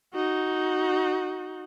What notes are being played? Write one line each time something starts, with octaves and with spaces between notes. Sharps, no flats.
D#4 F#4